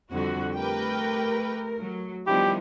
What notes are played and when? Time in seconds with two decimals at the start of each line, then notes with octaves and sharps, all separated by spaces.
0.12 F2 D3 G3 F#4
0.57 A3 G4 A#4 B4 G5
1.80 F#3
2.27 D#3 F3 G3 B3 D4 E4 G4